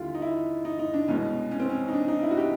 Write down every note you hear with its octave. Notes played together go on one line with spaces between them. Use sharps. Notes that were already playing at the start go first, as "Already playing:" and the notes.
Already playing: D#2 D3 G3 E4 F4
D#4
E4
D#4
D#4
D4
C2 B2 G#3 C#4
C#4
C4
C#4
D#4
D4
D#4
E4
F#4
G4